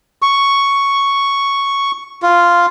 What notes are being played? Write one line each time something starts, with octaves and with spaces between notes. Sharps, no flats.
C#6
F4